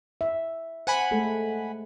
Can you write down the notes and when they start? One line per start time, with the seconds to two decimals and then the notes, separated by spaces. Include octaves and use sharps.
0.21 E5
0.87 C5 F#5 G#5 B5
1.11 G#3 A3 A4